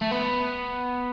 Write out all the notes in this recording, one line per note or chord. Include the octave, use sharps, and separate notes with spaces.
A3
B3